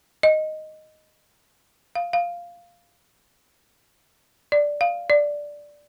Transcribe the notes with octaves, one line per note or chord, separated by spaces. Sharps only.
D#5
F5
F5
D5
F5
D5